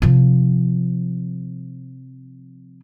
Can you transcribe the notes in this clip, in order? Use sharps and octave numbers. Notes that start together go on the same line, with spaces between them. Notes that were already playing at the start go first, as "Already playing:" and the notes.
C3 F3